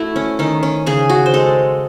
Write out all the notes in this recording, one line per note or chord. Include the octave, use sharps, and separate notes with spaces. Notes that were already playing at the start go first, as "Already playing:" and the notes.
Already playing: A3 E4 F#4
C#4
D#3 C#4
C#4
C#3 G#4
F#4
C5
G#3 A4